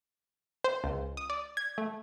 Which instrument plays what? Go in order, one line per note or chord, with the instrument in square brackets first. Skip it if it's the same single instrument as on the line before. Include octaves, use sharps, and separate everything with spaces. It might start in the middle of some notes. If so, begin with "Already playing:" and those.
[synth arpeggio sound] C5
C#2
D#6
D5
G#6
A3